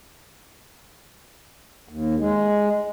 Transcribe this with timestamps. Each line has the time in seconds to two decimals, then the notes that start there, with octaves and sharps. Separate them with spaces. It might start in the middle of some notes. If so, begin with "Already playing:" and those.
1.89 D#2
2.19 G#3